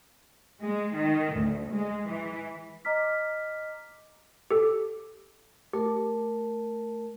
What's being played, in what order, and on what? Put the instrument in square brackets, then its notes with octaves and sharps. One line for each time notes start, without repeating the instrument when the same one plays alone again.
[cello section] G#3
D#3
D2
G#3
E3
[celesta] D#5 A#5 D6 F6 B6
[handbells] G4 A4
[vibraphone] A3 A#4 A5 [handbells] G4